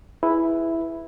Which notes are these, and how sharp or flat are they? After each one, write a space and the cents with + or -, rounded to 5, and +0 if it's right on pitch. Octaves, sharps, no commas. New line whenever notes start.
E4 +0 G#4 +0 B4 +0